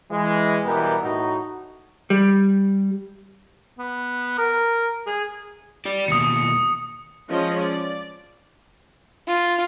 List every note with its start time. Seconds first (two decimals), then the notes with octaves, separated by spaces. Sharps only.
0.11 E3 G#3
0.65 B2 E3 G3 B3 G4 A#4
1.02 A2 D#4 F#4
2.10 G3
3.79 B3
4.38 A#4
5.07 G#4
5.85 G4 D5
6.08 D#2 B2 D#6 C#7
7.28 F3 G#3 C#4 D#5
7.61 D5
9.28 F4